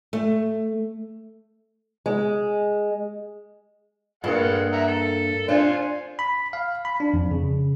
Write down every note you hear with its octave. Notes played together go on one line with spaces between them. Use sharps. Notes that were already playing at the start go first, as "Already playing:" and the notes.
A3
G#3
G2 G#3 A#3 A4 F#5
E5 F#5 A#5
A4
D4 F4 C5 G#5
B5
F5
B5
D4
F2
C#3